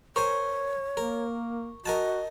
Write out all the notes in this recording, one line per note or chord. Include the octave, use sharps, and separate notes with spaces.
A#4 C5 C#5 G#5 C#6
A#3 A#4
F#4 A#4 D#5 G#5 A5